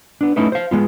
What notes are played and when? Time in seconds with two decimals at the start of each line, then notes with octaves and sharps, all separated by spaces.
0.21 B3 D4
0.36 A3 C#4 D#4 E4 B4
0.52 C5 F5
0.71 G#3 B3 F4